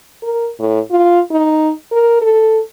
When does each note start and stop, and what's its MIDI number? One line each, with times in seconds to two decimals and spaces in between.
0.22 0.49 70
0.59 0.79 45
0.90 1.20 65
1.31 1.72 63
1.91 2.19 70
2.21 2.60 69